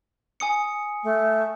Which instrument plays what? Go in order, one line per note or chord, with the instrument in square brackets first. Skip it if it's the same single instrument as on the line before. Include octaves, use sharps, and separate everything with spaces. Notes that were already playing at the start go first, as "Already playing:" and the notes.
[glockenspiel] G#5 D#6 C#7
[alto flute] A3